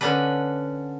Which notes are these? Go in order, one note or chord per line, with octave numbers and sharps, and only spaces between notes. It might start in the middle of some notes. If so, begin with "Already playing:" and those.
D3 C#4 D4 B4